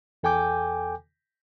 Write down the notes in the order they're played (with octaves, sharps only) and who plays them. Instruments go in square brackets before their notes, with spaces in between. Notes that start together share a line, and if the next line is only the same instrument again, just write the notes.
[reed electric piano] E2 A4 G5 G#5 D6 G6